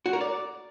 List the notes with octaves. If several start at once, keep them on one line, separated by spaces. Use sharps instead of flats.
F#4
A#4
D5